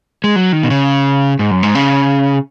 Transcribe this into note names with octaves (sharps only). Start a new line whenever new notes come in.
G#3
F#3
D#3
B2
C#3
G#2
F#2
G#2
C#3